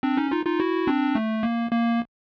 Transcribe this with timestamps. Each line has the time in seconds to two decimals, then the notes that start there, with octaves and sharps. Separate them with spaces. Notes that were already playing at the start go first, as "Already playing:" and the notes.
0.03 C4 D4
0.17 C#4 D#4
0.31 D#4 F4
0.45 D#4 F4
0.60 E4 F#4
0.87 C4 D4
1.15 A3
1.43 A#3
1.71 A#3